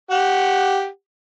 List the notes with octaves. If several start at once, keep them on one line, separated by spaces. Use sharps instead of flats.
G4 F#5